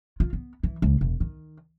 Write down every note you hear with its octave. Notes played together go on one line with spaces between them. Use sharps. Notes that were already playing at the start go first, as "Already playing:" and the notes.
F4
B3
E3
C#2
E1
D#3